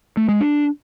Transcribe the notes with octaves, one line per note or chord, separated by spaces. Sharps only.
A3
G#3
D4